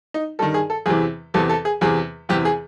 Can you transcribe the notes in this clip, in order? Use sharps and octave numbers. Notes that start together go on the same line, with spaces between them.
D#4
G2 D#3 A4
G#4
A4
E2 C3 E3 G#4
E2 C3 E3 A4
A4
G#4
E2 C3 E3 G#4
E2 C3 E3 G4
G#4